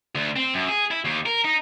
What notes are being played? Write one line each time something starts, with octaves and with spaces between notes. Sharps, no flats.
D2
C4
F#2
G#4
E4
D#2
A#4
D#4